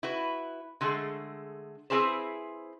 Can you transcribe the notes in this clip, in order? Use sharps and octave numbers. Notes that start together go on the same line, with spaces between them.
E4 F#4 B4
D3 G#3 A3 G#4
C4 E4 G#4 B4 C5